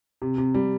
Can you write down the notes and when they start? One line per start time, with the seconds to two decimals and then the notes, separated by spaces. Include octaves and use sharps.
0.22 C3
0.38 C3
0.54 G3